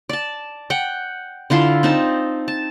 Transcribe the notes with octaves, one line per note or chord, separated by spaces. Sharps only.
D5 A5
F#5 G5
D3 E4 F4 C6
C4 D#4 A5
A5